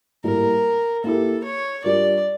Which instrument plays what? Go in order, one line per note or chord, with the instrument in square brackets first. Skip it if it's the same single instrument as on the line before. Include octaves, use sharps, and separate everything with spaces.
[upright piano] A2 G3 A#3 [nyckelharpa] A#4
[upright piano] A#3 E4 G4 [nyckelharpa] A4
[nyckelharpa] C#5
[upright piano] G3 D4 F4 A#4 [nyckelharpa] D5